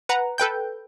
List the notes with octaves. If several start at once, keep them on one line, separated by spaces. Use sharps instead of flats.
B4 F#5 A#5
A4 B4 G5 G6